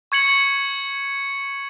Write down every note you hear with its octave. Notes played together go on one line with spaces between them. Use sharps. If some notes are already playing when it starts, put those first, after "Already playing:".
C#6 G#6 C#7 F#7